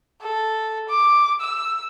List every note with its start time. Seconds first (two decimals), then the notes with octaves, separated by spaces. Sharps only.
0.22 A4
0.89 D6
1.41 E6